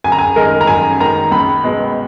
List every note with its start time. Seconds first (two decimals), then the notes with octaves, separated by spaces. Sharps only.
0.04 F#2 G#5
0.12 A#5
0.19 G#5
0.36 D#3 G#3 A#4
0.61 A#5
0.67 F#2 G#5
1.00 D#3 G#3 A#5
1.31 C#2 B5
1.64 B2 G#3